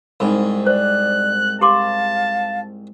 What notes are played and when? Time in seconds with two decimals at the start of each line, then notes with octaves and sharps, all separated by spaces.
0.20 C2 G#2 D#4 B5
0.66 C5 D5 F#6
1.61 G4 F5 A5 C6 D6